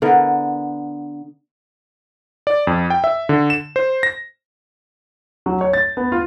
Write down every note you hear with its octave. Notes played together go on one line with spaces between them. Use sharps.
D3 B3 E4 A#4
D5
F2
G5
E5
D3
E7
C5
A#6
F#3
C#5
A6
B3
F4